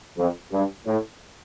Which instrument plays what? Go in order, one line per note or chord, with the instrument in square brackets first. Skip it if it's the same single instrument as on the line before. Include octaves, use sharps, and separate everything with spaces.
[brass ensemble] F2
G2
A2